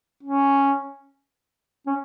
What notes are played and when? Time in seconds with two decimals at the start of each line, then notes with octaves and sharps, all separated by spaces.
0.23 C#4
1.86 C#4